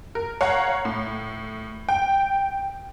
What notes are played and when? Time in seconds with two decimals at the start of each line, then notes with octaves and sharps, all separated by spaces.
0.15 A#4
0.41 C#5 F5 F#5 A#5
0.85 A2
1.89 G5